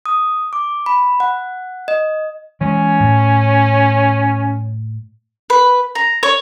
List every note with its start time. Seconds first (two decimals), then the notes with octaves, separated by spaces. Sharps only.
0.06 D#6
0.53 D6
0.86 B5
1.20 F#5
1.88 D#5
2.61 E3 G#3 C#4
3.00 A2
5.50 B4
5.95 A#5
6.23 C#5